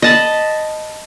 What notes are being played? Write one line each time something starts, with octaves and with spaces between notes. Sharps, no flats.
D#5 A5 B5